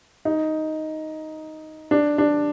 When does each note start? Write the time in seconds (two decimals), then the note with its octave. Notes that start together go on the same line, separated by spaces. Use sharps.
0.25 D#4
1.91 D4
2.18 D4